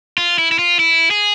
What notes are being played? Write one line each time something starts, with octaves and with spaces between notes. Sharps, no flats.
F4
E4
E4
F4
E4
G#4